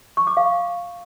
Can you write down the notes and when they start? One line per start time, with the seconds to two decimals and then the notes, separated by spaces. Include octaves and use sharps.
0.17 C#6
0.27 D6
0.37 F5